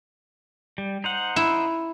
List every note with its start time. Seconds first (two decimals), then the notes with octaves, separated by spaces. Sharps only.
0.78 G3
1.04 D#4 C5 F#5
1.36 E4